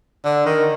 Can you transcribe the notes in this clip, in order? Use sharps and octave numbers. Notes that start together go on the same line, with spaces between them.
D3
D#3